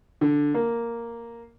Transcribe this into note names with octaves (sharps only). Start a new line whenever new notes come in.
D3
A#3